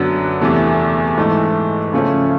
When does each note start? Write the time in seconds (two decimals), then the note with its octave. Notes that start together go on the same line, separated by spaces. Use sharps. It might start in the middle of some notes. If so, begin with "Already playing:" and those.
Already playing: F#2 D3 F#3 B3 D4
0.41 E2 C3 E3 A3
1.17 G#2 E3 A3
1.93 C#3 F3 A3 C#4